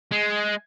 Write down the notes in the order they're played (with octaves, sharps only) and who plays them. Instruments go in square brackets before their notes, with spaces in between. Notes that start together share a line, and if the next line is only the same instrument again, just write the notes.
[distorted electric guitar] G#3